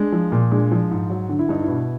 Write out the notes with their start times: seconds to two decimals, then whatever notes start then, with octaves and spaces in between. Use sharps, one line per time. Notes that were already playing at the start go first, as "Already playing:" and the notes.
Already playing: G#3 D4
0.12 F3
0.32 A#2
0.51 G#3 D4
0.72 F3
0.91 G#2
1.10 F#3
1.29 D3
1.39 E4
1.49 G2 D#4
1.63 E4
1.68 B2